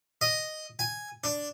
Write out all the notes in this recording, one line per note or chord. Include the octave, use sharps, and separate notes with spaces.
D#5
G#5
D4